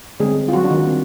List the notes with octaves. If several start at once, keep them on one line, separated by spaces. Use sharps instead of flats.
D3 G3 G#3 C4 G#4
F4
F#3 F#4
D4
D#3 D#4
G3 C4